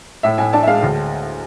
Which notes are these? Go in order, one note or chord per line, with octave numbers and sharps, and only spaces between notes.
A2 E5
A2 G#5
D4 A5
E5
G#3 F5
D2